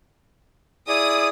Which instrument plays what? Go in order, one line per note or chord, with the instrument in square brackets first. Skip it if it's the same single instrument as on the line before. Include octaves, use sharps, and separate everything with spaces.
[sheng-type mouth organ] E4 G#4 D5 [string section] D#6